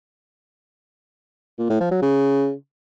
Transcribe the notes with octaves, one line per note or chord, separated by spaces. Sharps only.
A#2
A2
F3
F#3
C#3